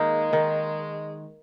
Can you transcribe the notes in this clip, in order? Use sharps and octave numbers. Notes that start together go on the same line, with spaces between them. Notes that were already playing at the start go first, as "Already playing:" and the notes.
Already playing: D#3 G#3 A#3 D#4
D#3